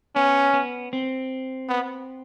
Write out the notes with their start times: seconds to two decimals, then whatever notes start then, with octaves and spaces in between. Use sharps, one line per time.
0.16 B3 C#4
0.53 B3
0.93 C4
1.69 B3